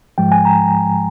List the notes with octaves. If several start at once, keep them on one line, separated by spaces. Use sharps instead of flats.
G#2 F3 G#3 G5
G#5
A#5